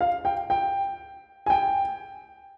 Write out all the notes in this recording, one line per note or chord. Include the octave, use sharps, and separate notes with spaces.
F5
G5
G5
G#5
G5